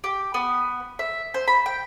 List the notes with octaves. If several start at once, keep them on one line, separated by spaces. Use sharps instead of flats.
G4
B3
E5
C5
B5
G5